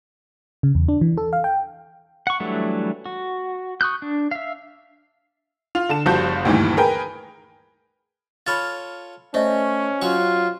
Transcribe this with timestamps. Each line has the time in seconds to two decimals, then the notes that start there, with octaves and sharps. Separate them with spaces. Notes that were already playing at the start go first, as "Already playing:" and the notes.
0.63 C#3
0.75 E2
0.88 D4
1.01 E3
1.17 A4
1.33 F5
1.44 G5
2.27 F#5 C#6
2.40 E3 F#3 G3 A3 D4
3.06 F#4
3.81 C#6 D#6 F#6 G6
4.02 D4
4.31 E5 F5
5.75 F4
5.89 D3 A5 E7
6.06 F#1 F3 G3 F#4 A5 G6
6.45 D2 G2 A#2 D#3 E3
6.77 G#4 A#4 B4 G5
8.47 F4 A4 C#5 B5 F6 A6
9.34 A3 C#4 C5 D5 D#5
10.02 F#3 F4 C#6